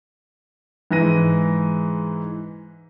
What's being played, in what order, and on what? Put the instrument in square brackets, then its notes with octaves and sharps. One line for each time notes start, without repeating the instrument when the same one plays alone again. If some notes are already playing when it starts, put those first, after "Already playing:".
[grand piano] G#2 E3 A#6 D#7